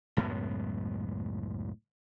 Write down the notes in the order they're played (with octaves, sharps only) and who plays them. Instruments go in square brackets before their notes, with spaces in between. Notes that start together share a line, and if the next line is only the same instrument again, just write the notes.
[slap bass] C#2 F#2 A2 B3